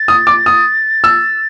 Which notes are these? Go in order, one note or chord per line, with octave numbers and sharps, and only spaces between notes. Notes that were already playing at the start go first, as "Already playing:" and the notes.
Already playing: A6
D#6
D6
D#6
E6